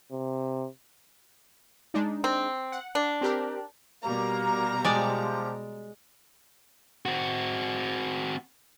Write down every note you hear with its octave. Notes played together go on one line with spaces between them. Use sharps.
C3
G#3 D4 D#4
C4
F#5
D4
C4 G4 A#4
B2 G3 A#3 A#5
F3 G#3 G4 D5
C4 F#4